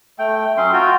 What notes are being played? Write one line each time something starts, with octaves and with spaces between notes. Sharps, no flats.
A3 G5
F#3 C#4 C6
F4 F#4 G5